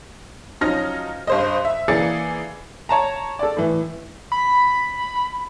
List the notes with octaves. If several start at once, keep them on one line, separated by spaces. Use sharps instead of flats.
F3 F#3 C#4 D#4 F6 A#6
G2 C5 D#5
E5
E3 A#3 G#4 D5 A6 C#7
C#5 A5 A#5
A4 D5
A2 E3
B5